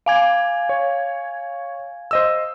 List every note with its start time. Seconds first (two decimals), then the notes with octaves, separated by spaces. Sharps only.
0.06 F5 G#5 G#6
0.69 C#5
2.11 C5 D#5 E6